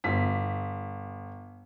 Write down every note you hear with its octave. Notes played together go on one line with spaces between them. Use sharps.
G1 B6